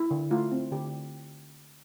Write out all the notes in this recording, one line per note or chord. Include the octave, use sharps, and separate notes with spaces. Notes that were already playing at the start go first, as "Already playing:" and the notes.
Already playing: E4
D3
A3 F4
C4
D3 G4